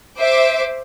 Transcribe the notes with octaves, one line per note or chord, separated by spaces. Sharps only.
C5 E5 D6